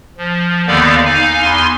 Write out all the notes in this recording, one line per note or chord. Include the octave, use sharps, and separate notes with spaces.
F3
D#2 D3 D#3 B3 D5 F5
D#4 F5 G#5
E2 G#5 C6